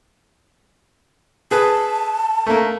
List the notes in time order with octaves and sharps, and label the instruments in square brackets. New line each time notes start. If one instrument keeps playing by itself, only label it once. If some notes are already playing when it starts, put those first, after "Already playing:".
[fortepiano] G#4 B4 [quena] A5
[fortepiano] A3 A#3